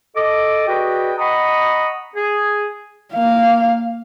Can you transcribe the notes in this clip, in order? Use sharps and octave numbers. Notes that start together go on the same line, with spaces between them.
A4 D#5 D6
F#4 G#4 B4 D5 D#5 G5
D#5 F#5 A#5 B5 C#6 D#6
G#4
A#3 F5